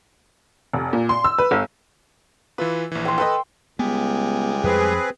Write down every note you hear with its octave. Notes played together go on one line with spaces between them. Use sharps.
F1
A#2
C6
E6
B4
G1
E3 F4 B4 E6
A#1 E3
G5 C6
A4 B4 D#5 G5 E6
C#2 G3 G#3 B3
F2 C4 G#4 B4